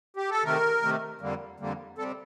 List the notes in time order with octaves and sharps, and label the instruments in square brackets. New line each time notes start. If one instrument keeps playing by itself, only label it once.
[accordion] G4
A4
C3 D#3 A3 A#4
C3 D#3 A3
F2 D3 G3 A#3
F2 D3 G3 A#3
C3 G3 C4 A4